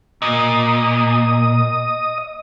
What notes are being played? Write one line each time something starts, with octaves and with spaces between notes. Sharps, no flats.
A#2 D#5 D#6